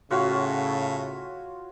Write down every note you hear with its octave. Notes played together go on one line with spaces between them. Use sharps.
A2 C#3 F4 F#4 C#5